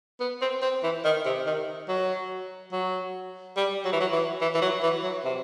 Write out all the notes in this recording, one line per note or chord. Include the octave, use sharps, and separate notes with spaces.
B3
C4
C4
E3
D#3
C3
D#3
F#3
F#3
G3
F#3
E3
F#3
E3
E3
E3
F#3
E3
F#3
C3